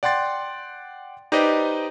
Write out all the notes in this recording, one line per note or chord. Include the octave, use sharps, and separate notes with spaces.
D5 F#5 G5 C6 A6
D#4 G4 B4 C5 D5 D#5